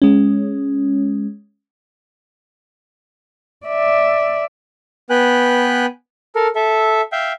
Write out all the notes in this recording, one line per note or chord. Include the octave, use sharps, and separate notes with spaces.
G#3 C#4
D5 E5
B3 B4 G5 G#5 F#6
A4 A#4
A4 E5
E5 F5 G5